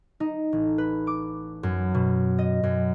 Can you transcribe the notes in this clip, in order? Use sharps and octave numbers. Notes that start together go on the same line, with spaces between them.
D#4
A1
B4
D6
F#2
B2
D#5
F#2